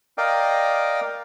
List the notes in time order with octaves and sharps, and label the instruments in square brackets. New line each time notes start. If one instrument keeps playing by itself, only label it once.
[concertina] A#4 D5 D#5 F5 G5